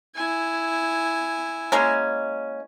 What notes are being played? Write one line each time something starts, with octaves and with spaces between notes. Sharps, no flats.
E4 G#5
G#3 A#3 C#4